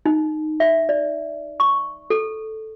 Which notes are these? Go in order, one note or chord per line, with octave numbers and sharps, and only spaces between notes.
D#4
E5
D5
C#6
A4